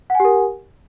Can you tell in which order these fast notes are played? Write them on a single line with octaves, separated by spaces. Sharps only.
F#5 G#5 G4 A#4